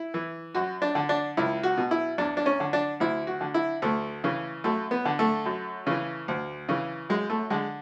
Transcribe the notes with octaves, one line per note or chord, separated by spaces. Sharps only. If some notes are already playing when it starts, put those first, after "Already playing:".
Already playing: E4
E3
F#2 F#4
D4
D3
D4
C#2 E4
F#4
B2
E4
E2 D4
D4
C#4
D3
D4
D2 E4
F#4
D3
E4
D2 A3
C#3 E3
F#2 A3
B3
D3
A3
F#2
C#3 E3
D2
C#3 E3
F#2 G#3
A3
D3 G#3